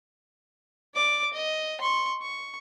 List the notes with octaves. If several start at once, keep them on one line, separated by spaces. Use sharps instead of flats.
D5 D6
D#5
C6 C#6
C#6